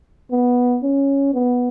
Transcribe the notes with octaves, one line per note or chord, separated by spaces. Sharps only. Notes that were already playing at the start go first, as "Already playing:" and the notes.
B3
C#4
B3